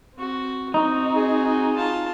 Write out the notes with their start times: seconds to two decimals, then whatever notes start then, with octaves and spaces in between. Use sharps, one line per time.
0.15 C4 F#4
0.74 C4 D#4 F#4
1.16 G#4
1.76 F4 A5